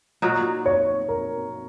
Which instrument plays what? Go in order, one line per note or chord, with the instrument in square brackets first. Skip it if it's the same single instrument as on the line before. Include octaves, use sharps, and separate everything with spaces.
[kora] A#2 F#3 D#4 F#4
[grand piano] C#5
A#4